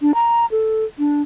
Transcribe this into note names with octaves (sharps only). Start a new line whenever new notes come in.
D4
A#5
A4
D4